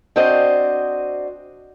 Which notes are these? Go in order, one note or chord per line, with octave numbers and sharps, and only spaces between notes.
C4 D4 F#4 C5 D5 D#5